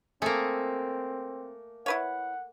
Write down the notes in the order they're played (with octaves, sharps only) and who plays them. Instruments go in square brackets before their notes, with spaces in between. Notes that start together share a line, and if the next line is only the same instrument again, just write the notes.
[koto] A3 A#3 [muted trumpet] C4 [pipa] G#4
[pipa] E4 B4 C#5 [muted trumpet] F#5